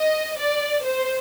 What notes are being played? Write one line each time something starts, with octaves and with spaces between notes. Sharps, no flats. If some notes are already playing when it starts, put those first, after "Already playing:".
Already playing: D#5
D5
C5